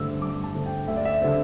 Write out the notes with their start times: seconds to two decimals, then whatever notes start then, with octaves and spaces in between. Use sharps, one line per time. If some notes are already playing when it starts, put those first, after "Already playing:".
Already playing: G2 D3 A3 C4 E6
0.22 G2 D6
0.44 A5
0.55 D3 A3 C4
0.66 G5
0.88 D2 E5
0.97 D5
1.05 E5
1.21 D3 C4